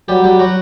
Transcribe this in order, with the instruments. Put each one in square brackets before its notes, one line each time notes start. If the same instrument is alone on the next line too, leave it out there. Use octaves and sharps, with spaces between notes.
[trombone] F#3 [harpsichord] G3 G4
[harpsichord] G3 G4
F#3 F#4